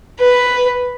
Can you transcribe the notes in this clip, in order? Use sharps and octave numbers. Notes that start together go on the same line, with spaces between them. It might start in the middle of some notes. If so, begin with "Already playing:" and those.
B4